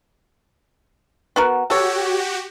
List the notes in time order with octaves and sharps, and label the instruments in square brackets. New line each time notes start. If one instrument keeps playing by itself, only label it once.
[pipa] B3 F#4 A#4
[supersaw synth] F#4 G4 [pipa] A4 C#5